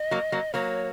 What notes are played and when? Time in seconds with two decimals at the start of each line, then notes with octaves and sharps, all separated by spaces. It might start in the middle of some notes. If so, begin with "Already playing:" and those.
Already playing: D#5
0.11 F#3 A#3
0.32 F#3 A#3
0.54 F#3 A#3 C#5